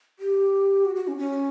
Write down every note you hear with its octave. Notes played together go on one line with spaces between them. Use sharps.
G4
F#4
F#4
C#4
C#4